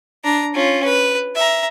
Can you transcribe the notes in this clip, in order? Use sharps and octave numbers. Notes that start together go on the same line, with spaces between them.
D4 A#5
C#4 F4
B4
E5 A#5